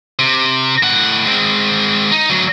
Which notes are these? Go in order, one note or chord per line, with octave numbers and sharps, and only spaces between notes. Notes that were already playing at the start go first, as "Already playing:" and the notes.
C3
A2 F#5
G#3 C4
D#4
D2 F#3